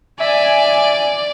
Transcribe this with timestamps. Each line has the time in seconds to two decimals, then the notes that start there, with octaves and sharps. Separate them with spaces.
0.20 D5 E5 G#5